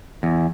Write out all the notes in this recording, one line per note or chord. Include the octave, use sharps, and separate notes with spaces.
E2